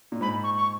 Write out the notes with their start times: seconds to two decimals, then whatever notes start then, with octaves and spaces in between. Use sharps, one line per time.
0.12 A#2
0.21 G#2 B5
0.44 C#6
0.56 C#6